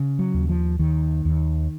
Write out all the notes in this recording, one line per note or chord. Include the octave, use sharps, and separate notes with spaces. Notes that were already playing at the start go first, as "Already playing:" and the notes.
Already playing: C#3
F#3
D#2
F3
D#2 D#3
D#2